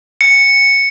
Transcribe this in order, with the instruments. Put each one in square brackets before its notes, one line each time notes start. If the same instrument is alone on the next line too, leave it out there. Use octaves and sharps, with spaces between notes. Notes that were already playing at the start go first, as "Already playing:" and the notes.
[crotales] C#7